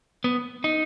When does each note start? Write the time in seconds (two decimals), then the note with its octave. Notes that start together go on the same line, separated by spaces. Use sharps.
0.24 B3
0.64 D#4